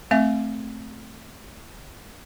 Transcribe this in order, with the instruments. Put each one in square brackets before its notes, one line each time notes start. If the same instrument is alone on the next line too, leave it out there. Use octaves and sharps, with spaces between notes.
[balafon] A3 C4 E5